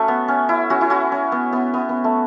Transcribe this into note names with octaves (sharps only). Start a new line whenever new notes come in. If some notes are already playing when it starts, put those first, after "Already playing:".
Already playing: A3 C#4 F#4
B3
C#4
E4
C#4 F#4
E4
C#4 F#4
C#4
B3
B3
B3
B3
A3